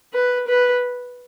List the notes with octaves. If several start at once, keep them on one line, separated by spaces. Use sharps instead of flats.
B4
B4